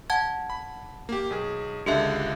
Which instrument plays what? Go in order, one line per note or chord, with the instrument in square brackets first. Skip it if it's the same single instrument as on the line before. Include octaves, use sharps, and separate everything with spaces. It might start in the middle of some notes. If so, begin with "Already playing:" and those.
[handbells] F#5 A5 G#6
[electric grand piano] B5
A#3 G4
B1 G#4
[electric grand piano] C#2 D3 G#3 [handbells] G4 E5